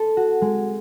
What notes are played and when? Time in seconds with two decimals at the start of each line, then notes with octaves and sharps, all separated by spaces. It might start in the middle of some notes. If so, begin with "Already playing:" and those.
Already playing: C4 A4
0.17 F#4
0.42 G#3